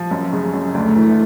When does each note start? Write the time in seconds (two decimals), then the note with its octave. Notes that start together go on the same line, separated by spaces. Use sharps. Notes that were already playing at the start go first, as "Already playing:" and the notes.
Already playing: F3
0.11 F#2
0.33 C#3
0.53 F#2
0.74 D2 A3
0.96 E3